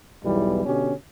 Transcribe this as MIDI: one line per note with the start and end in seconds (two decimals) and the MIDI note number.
0.23 0.62 35
0.23 0.62 40
0.23 0.62 52
0.23 0.62 55
0.65 0.94 47
0.65 0.94 50
0.65 0.94 61
0.65 0.94 67